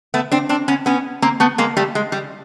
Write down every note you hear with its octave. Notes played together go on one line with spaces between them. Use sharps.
A3 B3
C4 D4
C4 D4
B3 C#4
B3 C#4
A#3 C4
A3 B3
G#3 A#3
G3 A3
G#3
G3